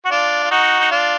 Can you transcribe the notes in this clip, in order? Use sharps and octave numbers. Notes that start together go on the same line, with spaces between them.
F#4
D4 F4
F4
D#4 F#4
D#4
D4 F4